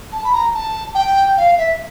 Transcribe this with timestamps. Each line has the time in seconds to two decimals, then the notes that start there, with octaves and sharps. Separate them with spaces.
0.12 A5
0.24 B5
0.32 A#5
0.54 A5
0.95 G5
1.37 F5
1.58 E5